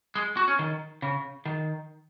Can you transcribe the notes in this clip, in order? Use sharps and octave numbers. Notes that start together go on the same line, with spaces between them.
G#3
F#4
C#4
D#3
C#3
D#3